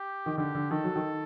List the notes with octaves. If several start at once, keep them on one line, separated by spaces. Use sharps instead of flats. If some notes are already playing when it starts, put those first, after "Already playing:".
Already playing: G4
D#3
D3 G4
D3
D#3 A4
F#3
D#3